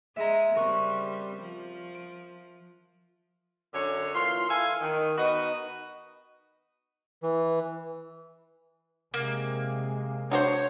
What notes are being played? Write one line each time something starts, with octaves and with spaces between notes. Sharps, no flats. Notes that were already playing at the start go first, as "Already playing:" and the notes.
G#3 G#4 E5 A#5
C#3 G3 C4 A#4 C#6 F#6
F3
D7
F#2 D3 C#5
A#2 E3 F4 C6
E3 E4 A4 F5 G#5
D#3
B3 D#4 F#4 B4 D#5
E3
C3 G#3 A#3
D4 F#4 C5 C#5